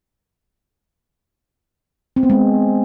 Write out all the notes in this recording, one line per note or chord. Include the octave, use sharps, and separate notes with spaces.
C4
B3
G#3